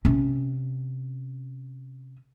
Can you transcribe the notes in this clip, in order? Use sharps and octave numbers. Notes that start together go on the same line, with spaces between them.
C3 C#4